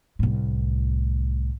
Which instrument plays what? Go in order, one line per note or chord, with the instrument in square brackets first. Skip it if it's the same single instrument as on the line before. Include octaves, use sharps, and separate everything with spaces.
[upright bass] C2 A2